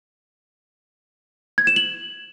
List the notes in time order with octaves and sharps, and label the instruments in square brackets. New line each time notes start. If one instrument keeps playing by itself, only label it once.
[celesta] G#6
E7
F#7